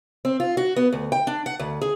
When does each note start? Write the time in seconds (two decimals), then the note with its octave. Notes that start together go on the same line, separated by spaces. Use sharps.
0.25 C4
0.40 F4
0.57 F#4
0.76 B3
0.93 D2
1.12 G5
1.27 D4
1.46 F#5
1.60 D2
1.81 G#4